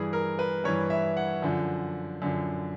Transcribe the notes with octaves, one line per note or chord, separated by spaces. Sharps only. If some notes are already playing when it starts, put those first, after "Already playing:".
Already playing: G2 E3 G#4
A#4
B4
G2 E3 C#5
E5
F#5
F#2 D3 F3
F#2 D3 F3